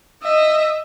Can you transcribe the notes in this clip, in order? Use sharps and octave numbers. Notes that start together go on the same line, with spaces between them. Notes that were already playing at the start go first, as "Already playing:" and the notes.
D#5 E5